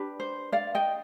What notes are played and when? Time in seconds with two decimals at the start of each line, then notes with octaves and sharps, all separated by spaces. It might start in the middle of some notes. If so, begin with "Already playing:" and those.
Already playing: D4 G4 B4
0.20 C5
0.52 D5 F5
0.75 D#5 G5